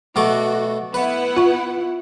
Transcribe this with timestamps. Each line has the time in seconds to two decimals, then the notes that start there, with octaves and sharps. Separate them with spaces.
0.16 B2 A3 F#4 D6
0.94 B3 E4 B4 F#5
1.37 F4 C#6